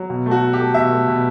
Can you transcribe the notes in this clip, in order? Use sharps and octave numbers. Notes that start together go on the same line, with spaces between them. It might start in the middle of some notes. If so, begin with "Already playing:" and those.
Already playing: F#3
B2
A3
F#4
A3
G4
A3
B2 E5
A3
B2